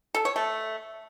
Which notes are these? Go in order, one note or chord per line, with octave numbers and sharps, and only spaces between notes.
A4
C#5
A3